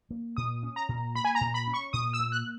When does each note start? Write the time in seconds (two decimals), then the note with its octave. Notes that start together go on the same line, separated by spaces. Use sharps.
0.11 A#3
0.37 A#2 D#6
0.63 C#4
0.76 A#5
0.89 A#2
1.15 A#3 B5
1.25 G#5
1.35 A#5
1.41 A#2
1.54 B5
1.67 C#4
1.74 C#6
1.93 A#2 D#6
2.13 E6
2.20 A#3
2.32 F#6